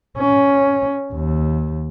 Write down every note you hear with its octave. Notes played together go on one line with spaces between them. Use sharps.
C#4
D#2